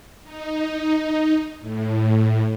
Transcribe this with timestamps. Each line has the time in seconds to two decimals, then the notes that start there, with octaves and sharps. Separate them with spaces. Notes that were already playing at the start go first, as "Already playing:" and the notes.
0.23 D#4
1.60 A2